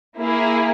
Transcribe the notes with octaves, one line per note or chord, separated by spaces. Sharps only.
A#3 E4 G#4